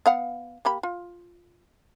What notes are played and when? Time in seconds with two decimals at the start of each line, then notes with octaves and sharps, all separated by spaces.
0.06 B3 F5 F#5
0.65 A#3 G4 B5
0.83 F4